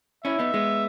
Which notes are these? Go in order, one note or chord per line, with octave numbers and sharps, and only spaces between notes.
C#4 E4 E5
B3 D#4
G#3 B3